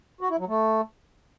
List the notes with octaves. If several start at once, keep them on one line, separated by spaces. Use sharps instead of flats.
F#4
E4
F#3
A3